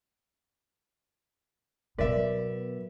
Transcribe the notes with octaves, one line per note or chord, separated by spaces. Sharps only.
B2 F#3 B3 A#4 D5 E5